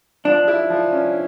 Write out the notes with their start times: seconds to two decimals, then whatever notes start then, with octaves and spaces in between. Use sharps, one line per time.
0.25 F3 D4
0.48 E4
0.70 F3
0.92 C#4